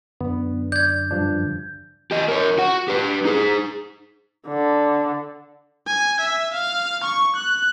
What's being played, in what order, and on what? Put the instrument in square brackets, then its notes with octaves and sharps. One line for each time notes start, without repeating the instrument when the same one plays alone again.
[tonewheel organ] F#2 D3 [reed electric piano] B3
[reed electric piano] D5 [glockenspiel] G6 G#6
[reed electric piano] G2 F3 D4
[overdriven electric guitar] G4 D#5
A#4 C#5
F#4 F#5
G4 B4
D#4 G#4
[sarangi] D3
[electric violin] G#5
E5
F5
C#6
F#6